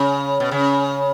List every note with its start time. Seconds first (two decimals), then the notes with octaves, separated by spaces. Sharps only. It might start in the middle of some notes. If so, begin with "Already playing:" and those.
Already playing: C#3
0.40 B2
0.51 C#3